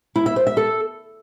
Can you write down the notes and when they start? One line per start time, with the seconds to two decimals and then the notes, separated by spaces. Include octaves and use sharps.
0.16 E4
0.26 E5
0.36 C5
0.47 E5
0.57 A4